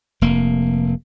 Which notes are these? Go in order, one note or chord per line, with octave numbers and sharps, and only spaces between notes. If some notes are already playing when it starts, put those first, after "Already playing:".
F1 A#3